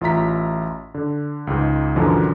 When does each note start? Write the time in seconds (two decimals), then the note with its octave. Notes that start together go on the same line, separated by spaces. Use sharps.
0.01 A1 F4 E5 A#5 B6
0.95 D3
1.47 C#2 G#2
1.95 F#2 A#2 D3 E3 F3